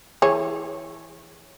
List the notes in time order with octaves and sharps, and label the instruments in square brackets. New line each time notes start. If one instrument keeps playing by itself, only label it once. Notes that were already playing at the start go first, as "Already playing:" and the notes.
[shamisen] E3 G#4 C#5